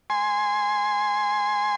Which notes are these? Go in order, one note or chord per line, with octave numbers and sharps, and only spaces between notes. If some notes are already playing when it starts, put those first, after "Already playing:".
G#5 C6